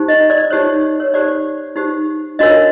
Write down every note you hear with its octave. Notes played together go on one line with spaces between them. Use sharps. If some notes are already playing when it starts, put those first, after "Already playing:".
Already playing: D#4 G4 C5
D#5
D5
D#4 G4 C5 C#5
C#5
D#4 G4 C5 D5
D#4 G4 C5
D4 F#4 A#4 C#5 D#5